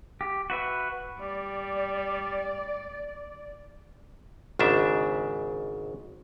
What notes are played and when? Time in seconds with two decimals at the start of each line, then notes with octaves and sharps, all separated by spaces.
0.21 G4
0.50 F#4 B4 E5
1.20 G3 D5
4.59 G#1 G#2 C#3 D4 E5